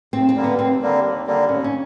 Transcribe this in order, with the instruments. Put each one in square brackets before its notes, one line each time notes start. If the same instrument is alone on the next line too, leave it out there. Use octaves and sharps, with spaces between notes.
[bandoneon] D#2 [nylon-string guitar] C4
[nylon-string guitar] C4
[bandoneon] D3 G3 A#3
[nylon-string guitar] B3
[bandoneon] D#2 [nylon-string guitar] C4
[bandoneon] D3 G3 A#3
D#2
D3 G3 A#3
[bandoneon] D#2 [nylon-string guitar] C#4
[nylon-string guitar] C#4